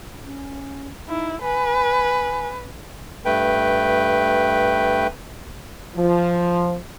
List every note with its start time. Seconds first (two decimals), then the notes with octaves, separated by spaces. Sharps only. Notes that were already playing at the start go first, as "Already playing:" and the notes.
0.24 C#4
1.08 D#4 E4
1.42 B4 G#5
3.25 G2 A3 B4 G5
5.96 F3